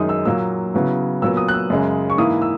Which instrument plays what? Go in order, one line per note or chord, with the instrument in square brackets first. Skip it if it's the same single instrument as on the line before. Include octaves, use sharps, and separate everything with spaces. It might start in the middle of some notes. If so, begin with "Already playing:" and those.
Already playing: [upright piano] F#2 D#3 G#3 D#4 D#6
E6
A#2 F#3 A#3 E6
C#3 F#3 B3 E4
A#2 F#3 B3 E6
D#6
F#6
E6
F#2 C#3 G#3
C#6
G#2 E3 A#3 E4 D#6
E6